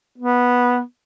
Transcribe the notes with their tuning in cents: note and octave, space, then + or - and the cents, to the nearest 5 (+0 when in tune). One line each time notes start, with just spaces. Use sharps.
B3 -10